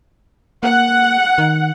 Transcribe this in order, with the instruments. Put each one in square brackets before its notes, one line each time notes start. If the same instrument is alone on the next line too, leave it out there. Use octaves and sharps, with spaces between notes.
[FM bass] A#3 [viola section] F#5
[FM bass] D#3